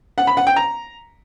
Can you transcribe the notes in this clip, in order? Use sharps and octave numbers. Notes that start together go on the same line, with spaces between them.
F#5
B5
F#5
G5
A#5